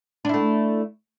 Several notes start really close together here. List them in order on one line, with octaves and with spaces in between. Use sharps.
D4 E4 A3